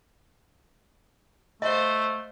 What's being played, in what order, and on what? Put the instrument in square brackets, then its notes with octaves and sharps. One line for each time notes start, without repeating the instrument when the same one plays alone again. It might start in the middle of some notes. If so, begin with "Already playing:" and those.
[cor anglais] A3 [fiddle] C5 F5 [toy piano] D#5